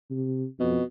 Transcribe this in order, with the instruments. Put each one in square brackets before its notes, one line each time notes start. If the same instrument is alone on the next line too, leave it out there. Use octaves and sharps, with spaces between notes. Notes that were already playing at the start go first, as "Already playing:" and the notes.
[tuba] C3
[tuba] F2 [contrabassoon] B2